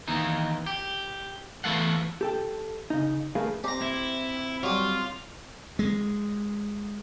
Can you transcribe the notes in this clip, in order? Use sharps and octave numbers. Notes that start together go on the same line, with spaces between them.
D#2 E3 D#4
G4
E3 A3 B3 A4 F5 F#5
G4 A4 G5
C#3 D#4
A3 G#4 A#4 B4 F5
C4 G4 A#5
E4
F#3 G3 F4
G#3